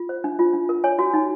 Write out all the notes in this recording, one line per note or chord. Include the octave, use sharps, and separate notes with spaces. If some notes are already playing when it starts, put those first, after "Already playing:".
Already playing: F4
C5
D4
F4
D4
A#4
C#5 G#5
F#4
D#4